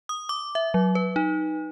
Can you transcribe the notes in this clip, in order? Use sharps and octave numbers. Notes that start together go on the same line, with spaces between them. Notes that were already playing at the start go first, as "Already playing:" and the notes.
D#6
D6
E5
F#3
B4
D#4